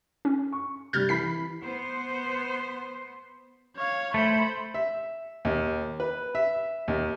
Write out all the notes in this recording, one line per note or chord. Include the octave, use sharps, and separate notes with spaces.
C#4
C#6
C3 G3 F6 G6 A6
E3 B5 B6 C7
B3 C5
C#5 F5
A3 C5 B5
E5
D#2
B4
E5
D#2